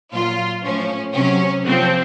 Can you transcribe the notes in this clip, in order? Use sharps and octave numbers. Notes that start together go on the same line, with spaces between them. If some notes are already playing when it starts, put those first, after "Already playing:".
A#2 F#3 F4
A2 F3 C#4
C3 F#3 C#4
C3 F3 C4